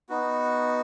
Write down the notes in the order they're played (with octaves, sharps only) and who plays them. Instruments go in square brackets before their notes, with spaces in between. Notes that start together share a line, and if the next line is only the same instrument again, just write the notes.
[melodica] B3 D#4 F#4